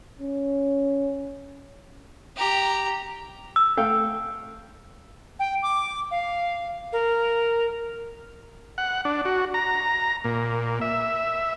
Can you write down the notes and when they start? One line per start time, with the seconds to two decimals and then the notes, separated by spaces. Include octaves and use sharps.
0.19 C#4
2.37 G4 A#5
3.56 E6
3.77 A3 F5 G5
5.39 G5
5.63 D6
6.11 F5
6.93 A#4
8.78 F#5
9.05 D4
9.25 F#4
9.54 A#5
10.24 A#2
10.81 E5